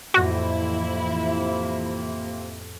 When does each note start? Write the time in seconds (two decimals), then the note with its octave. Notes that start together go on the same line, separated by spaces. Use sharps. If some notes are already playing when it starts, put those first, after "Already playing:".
0.14 F2 A2 C3 E3 A#3 E4 F#4 A#6